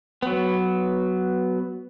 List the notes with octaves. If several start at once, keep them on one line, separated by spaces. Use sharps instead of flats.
F#3 B3